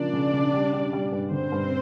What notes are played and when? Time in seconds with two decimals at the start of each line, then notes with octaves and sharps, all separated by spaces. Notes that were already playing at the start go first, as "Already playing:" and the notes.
Already playing: C#3 F3 A#3 D4 D5
0.13 C#3
0.33 C#3
0.54 G3
0.73 G3
0.93 G3
1.12 G2
1.31 D3 C4 C5
1.52 G2